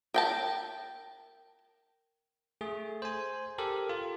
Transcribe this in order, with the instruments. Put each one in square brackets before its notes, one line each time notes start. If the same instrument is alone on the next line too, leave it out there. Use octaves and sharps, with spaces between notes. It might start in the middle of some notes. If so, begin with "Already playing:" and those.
[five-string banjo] A#4 G5 A5
[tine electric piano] A3 G#4
C5 G#5
G4 A4 A#4
F4